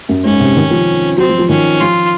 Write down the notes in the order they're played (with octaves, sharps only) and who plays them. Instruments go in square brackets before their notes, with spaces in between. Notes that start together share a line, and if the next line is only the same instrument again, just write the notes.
[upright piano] F#2
[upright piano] G#2 [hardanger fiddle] C#4
[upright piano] C3
D#3
F3
[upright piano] F#3 [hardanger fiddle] C4
[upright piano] F3
F3
[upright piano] D#3 [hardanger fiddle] C#4
[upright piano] F3 [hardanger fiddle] F4